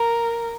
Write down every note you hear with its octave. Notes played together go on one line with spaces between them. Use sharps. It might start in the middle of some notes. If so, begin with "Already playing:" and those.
Already playing: A#4